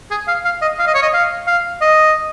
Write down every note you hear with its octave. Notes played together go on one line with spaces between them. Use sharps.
G#4
F5
F5
D#5
F5
D#5
C#5
D#5
F5
F5
D#5